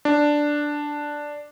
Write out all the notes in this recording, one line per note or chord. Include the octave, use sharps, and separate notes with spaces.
D4